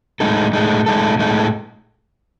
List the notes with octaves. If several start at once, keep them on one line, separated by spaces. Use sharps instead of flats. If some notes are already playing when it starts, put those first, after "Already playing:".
A2 G#3 D#4 A4
A2 G#3 D#4 A4
A2 G#3 D#4 A4
A2 G#3 D#4 A4